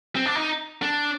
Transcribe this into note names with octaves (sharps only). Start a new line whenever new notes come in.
C4
D4
D#4
D4